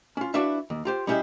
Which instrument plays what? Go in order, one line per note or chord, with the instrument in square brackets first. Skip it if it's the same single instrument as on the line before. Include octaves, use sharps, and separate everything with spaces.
[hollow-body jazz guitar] C#4 F4
D4 E4 F#4 B4 E5 F5
D#2
F4 G4 C5
G3 C#4 E4 G4 G#4 D#5